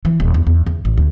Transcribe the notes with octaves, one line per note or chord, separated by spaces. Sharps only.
E3
D#1
E2
E2
E2
A1
D2